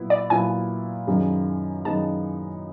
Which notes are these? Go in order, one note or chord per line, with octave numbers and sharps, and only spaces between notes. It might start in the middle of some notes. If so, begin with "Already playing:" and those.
Already playing: A#2 F#3 B3 E4
D5
A#2 F#3 B3 E4 G#5
F#2 D#3 G#3 B3 D#4
F#2 D#3 G#3 B3 D#4 A5